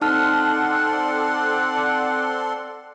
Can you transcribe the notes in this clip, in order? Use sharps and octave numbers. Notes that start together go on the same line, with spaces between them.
C4 D#4 A4 D5 F#5 A5 C6 F6